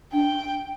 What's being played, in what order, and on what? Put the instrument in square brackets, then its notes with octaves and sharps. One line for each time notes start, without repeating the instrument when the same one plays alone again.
[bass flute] D4 [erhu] G5